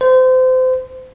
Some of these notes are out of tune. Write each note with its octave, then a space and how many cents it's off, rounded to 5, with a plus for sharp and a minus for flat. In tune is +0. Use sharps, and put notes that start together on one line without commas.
C5 -30